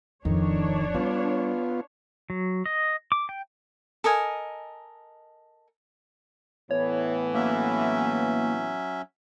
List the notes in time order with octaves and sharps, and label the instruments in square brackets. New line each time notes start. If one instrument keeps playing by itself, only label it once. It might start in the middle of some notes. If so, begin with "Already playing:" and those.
[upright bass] D1 F2 [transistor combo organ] D#3 [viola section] D4 C#5
[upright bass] G3 [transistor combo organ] B3 F4
[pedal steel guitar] F#3
D#5
D6
G5
[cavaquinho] A4 A#4 D#5 G#5
[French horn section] A2 E3 B3 [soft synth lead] C#5
[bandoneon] F#3 C#4 E5 [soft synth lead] A#3